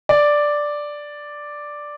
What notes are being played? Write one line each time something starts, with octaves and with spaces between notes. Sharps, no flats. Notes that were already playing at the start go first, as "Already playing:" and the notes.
D5